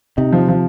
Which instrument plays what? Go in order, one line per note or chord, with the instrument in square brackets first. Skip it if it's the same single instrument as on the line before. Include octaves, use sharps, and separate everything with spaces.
[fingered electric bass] C3 [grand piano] D#4
[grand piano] F3
F3